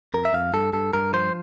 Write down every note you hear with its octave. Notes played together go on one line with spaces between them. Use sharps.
F2 A#4
E5
F2 F5
G2 A4
G2 A4
G2 A#4
F3 C5